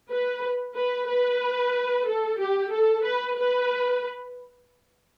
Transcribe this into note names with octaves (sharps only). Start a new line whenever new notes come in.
B4
B4
B4
A4
G4
A4
B4
B4